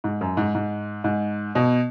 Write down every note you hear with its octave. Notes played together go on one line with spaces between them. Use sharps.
G#2
F#2
G#2
G#2
G#2
B2